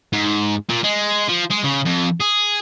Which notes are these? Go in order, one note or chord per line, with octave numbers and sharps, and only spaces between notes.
G#2
A#2
G#3
F3
G#3
C#3
F2
G#4